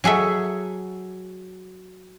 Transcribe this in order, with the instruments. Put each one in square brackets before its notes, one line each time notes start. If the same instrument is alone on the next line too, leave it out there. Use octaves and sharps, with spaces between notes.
[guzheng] F#3 G#4 A4 E5